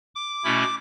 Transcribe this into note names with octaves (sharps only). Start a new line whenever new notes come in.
D6
B2 A3 C#4 E4